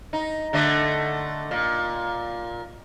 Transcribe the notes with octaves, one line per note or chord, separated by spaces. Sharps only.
D#4
D3 A3 D#5
A#2